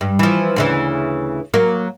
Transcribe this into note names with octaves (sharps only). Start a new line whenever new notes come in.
G2
E3 F3
D2 C#3 E3
F#3 A#3